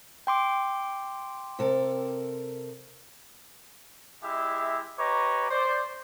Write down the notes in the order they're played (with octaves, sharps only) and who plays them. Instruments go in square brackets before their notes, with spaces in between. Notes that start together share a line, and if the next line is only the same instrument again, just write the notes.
[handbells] G5 C6 D6
[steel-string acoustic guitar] C3 A4 A#4
[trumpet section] G#3 E4 G4 E5
G4 B4 C#5 D#5 A#5 D6
C5 D5